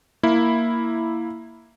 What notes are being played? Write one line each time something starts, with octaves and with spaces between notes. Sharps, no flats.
A#3 E4